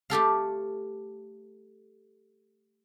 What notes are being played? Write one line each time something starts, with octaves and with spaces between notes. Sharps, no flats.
A3 G4 A4 F5